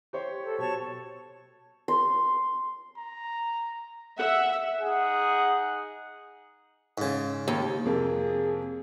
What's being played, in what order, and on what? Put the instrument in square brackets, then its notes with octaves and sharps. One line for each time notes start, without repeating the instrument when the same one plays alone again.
[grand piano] G4 C5 C#5
[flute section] A4
[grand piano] B2 [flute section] C#5 A5 C#6
[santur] C6
[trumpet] A#5
[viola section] E5 [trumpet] F#5
[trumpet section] D#4 G#4 F#5
[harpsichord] G#2 C#3
[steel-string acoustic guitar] D#2
[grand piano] F2 C3 A#3 [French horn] G#4